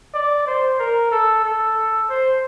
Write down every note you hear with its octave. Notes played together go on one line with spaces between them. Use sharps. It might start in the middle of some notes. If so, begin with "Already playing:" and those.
D5
C5
A#4
A4
A4
C5